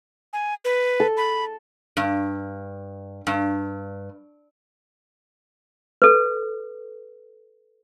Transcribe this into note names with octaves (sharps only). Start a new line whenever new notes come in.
G#5
B4
A4
B5
G2
G2
A4 B4